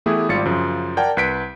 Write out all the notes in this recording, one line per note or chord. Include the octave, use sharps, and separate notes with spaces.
E3 A3 B3 E4 G4 G#4
G#1 G3 F4 A6 C#7
F#2 C#3 F3
A#4 D5 F#5 G5 A5 G#6
C2 B4 B6 D7